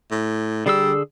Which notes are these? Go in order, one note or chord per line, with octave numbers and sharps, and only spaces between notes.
A2
D3 G3 G#4 E6